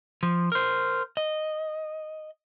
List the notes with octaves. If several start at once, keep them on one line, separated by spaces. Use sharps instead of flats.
F3
A#4 C5
D#5